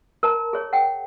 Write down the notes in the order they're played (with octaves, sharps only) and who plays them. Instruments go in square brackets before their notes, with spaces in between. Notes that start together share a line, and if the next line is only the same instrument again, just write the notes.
[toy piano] A#4 A5 A#5
G#4 C#5
F#5 G5